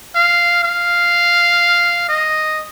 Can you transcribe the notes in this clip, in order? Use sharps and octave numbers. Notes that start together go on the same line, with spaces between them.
F5
F5
D#5